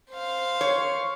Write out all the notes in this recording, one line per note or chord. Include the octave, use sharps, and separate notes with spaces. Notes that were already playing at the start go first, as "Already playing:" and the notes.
C5 F5
C#5